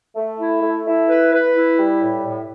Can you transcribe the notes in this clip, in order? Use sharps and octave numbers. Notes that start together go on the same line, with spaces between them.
A3
E4
A3
E4
B4
B4
E4
G3
A2
A2